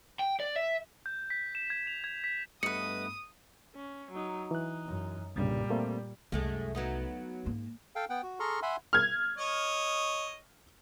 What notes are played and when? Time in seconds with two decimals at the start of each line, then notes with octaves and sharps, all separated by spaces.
0.19 G5
0.40 D5
0.56 E5
1.06 G6
1.30 B6
1.55 E7
1.70 G#6
1.87 F7
2.04 G#6
2.24 B6
2.63 G2 A3 B3 B4 D#5 D#6 C#7
3.75 C#4
4.12 F#3 D#4
4.51 E3 D#4 F#6
4.87 F#2
5.36 C2 G2 A#2 C#3 G3
5.70 A3 A#3 C4
6.32 C2 F#2 G#3 A3
6.75 F#3 B3 D#4
7.45 G#2 A#3
7.96 A4 F5 G5
8.09 B3 F#5 G5
8.23 F#4
8.40 G#4 A4 A#5 C6 C#6 F6
8.62 E5 F#5 G#5 B5 C6
8.93 F6 G#6
9.38 C#5 D#5